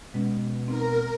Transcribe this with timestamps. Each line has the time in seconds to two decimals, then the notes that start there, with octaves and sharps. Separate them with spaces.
0.14 B2 G#3 C#4
0.68 C4 D#4 A#4